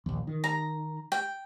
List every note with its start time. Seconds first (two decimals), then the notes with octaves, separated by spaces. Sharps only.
0.06 A#1 D#2
0.27 D#3
0.44 A#5
1.12 G5